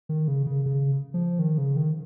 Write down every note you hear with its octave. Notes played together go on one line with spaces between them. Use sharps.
D#3
C#3
C#3
C#3
F3
D#3
C#3
D#3